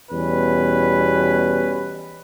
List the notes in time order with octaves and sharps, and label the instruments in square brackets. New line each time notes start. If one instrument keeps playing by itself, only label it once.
[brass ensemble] E2 B2 G3 C#4 B4